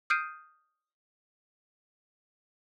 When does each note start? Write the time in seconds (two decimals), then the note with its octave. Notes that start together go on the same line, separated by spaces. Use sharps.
0.10 D#6 F6 G6 C7 D7 D#7